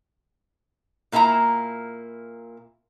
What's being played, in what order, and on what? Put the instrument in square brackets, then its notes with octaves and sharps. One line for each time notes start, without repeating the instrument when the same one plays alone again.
[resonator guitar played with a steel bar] A#2 A#3 E4 F4 A#5